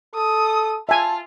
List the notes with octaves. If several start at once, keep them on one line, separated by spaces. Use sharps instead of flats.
A4 D#6
F4 E5 G#5 A5